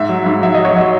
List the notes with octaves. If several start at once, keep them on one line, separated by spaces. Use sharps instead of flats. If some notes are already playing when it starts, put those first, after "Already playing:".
Already playing: G#2 E5
F#3
G#2
F#3 E5
F#3 D#5
C#5
F#3 D#5